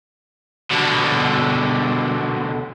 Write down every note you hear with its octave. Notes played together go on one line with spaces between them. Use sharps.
B2 D3